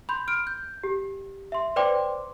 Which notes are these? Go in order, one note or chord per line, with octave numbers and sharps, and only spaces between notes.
B5 C6 G6
F6 D7
G6
G4
E5 C6
B4 C5 D5 G5 C6 D6